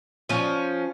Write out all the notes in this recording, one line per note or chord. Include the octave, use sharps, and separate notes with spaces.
F3 C#4